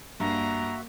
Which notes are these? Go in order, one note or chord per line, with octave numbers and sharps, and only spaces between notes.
G2 A#3 F#4 E5 A#5